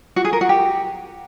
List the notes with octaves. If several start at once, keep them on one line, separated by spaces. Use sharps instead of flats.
F#4
G#4
A#4
F#4
G4